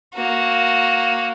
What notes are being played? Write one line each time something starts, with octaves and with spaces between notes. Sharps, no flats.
A#3 F#4